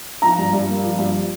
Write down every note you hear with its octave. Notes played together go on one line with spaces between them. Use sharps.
F3 A#5
G2
G2
A#3
F3
G2